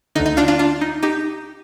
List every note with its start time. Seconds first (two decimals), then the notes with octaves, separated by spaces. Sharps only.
0.15 D3 D#4
0.20 D2
0.26 D#4
0.37 D4 F4
0.48 D4 F4
0.59 D4 F4
0.81 D#4
1.03 D#4 G4